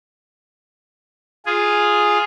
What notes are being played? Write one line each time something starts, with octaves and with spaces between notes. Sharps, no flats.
F4 G#4